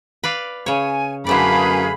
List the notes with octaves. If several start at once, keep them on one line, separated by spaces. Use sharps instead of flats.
B4 D5 F5
C#3 C#5 G#5
F#2 D3 A3 G#4 B4 D5 F5 B5